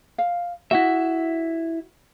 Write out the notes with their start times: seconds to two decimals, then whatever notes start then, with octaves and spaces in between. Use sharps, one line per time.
0.18 F5
0.71 E4 F#4 D#5 E5 F#5